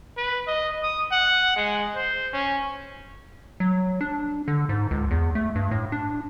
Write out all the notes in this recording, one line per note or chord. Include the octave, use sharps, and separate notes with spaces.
B4
D#5
D#6
F#5
G#3
C5
C#4
F#3
D4
D3
G#2
C#2
E2
A3
G2
A2
D4